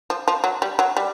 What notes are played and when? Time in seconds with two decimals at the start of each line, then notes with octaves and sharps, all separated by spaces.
0.10 F3
0.28 F3
0.44 F#3
0.62 G3
0.79 F#3
0.97 G3